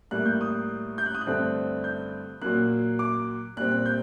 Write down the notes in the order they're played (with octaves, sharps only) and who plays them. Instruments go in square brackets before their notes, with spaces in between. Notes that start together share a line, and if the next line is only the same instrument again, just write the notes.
[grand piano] A2 G3 A#3 F#6
G6
D#6
G6
F#6
D#6
F#6
G2 D3 A3 C4
G6
A#2 F#3 A#3 F#6
D6
A#2 G3 C4 F#6
F#6
G6